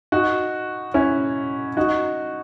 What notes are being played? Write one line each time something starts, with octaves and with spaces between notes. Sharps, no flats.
D#4 F#4
C#4 E4
D#4 F#4